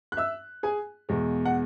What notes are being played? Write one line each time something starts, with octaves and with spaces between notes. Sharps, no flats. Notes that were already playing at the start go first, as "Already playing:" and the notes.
F#6
E5 E6
G#4 G#5
E2 B2 G#3
F#5